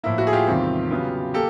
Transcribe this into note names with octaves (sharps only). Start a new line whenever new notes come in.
A2 F3 A#3 E4
E4 F#4
G#4
F4 G4
E2 C3 D#3 G3 C4
C#3 F#3 B3
A#3 G4 A4